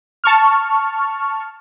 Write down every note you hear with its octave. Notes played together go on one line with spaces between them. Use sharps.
A5 C#6 F6